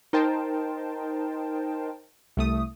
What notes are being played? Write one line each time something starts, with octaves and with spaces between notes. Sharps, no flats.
D#4 A#4 C5 G5 A5
C2 A3 D#6